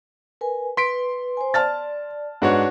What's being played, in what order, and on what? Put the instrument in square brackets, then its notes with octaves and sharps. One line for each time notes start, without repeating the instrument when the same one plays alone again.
[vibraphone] A#4 B4 G#5
[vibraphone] B4 [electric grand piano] C6 B6 D7
[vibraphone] C5 G#5
[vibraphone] D5 [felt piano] A5 F6 A6
[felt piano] G#2 G#3 [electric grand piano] D4 F#4 C#5 [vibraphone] B4